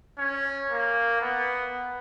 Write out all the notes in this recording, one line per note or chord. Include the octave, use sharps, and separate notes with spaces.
C#4
A#3
B3